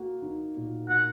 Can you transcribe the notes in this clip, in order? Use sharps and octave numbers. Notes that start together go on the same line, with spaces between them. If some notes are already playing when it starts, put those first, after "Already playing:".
Already playing: A#3 F#4
D#4
A#2
A#2 F#5